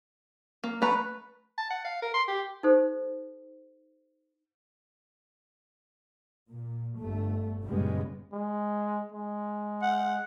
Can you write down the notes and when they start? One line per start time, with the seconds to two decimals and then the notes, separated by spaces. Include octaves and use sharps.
0.64 A#3
0.82 A3 B4 A#5
1.58 A5
1.70 F#5
1.85 F5
2.02 A#4
2.14 C6
2.28 G4
2.63 D#4 G4 A4 C5
6.49 A#2
6.98 G1 A3
7.64 F#1 A#2 C#3 G3 G#3 B3
8.33 G#3
9.12 G#3
9.83 F#5